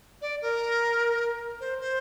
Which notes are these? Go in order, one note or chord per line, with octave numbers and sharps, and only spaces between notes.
D5
A#4
C5
C5